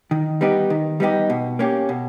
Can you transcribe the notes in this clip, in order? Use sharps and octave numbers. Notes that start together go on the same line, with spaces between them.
D#3
G3 B3 D#4 G4
D#3
G3 B3 D#4 G4
B2
A#3 C#4 G4
B2